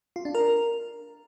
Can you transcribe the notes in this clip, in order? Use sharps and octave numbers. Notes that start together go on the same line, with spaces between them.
F4
D4
A#4